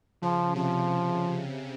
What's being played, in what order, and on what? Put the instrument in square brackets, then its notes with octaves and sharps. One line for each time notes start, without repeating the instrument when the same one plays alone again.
[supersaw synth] C#3 [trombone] F3
[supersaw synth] C3 [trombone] F3